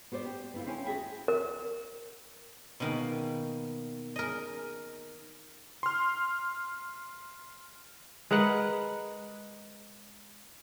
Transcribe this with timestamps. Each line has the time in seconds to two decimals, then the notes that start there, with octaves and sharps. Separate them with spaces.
0.12 B3 F#4 C5 D5
0.25 G4
0.54 B3 E4 F4
0.66 C4 C#4 E4 G#5
0.85 F#4 G#4 E5 G5
1.28 A#4
2.80 B2 D#3 A#3
4.16 A#4 D#5
5.83 C6 F6
8.31 G#3 A#4 B4 F#5